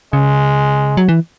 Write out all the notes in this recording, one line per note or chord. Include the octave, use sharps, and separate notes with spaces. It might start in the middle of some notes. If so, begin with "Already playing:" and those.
C#3 G#3
F#3
E3